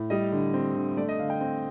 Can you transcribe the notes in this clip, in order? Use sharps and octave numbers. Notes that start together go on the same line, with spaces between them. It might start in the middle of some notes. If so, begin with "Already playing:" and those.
Already playing: A2
G3 D#5
D3
C4
D3
A3 D5
D#5
D3 F5
G5
C4